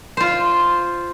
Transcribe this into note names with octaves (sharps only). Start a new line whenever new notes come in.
F4 C5